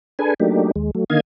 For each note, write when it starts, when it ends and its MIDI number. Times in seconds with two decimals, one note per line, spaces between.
0.19 0.34 62
0.19 0.34 68
0.19 0.34 69
0.19 0.34 71
0.19 0.34 80
0.40 0.71 54
0.40 0.71 57
0.40 0.71 58
0.40 0.71 62
0.40 0.71 63
0.40 0.71 67
0.76 0.91 39
0.76 0.91 56
0.95 1.04 54
0.95 1.04 57
1.10 1.20 50
1.10 1.20 51
1.10 1.20 58
1.10 1.20 75
1.10 1.20 77
1.10 1.20 92